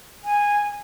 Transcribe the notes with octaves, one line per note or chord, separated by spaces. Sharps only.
G#5